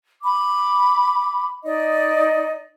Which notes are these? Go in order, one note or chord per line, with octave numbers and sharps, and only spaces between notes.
B5 D6
D#4 D5 D#5